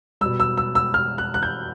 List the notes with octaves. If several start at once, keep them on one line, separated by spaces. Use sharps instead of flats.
B2 G3 E6
E6
E6
E6
F6
F#6
F#6
G6